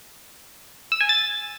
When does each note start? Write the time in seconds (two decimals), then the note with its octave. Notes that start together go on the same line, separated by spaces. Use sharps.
0.92 E6
1.01 G#5
1.09 A6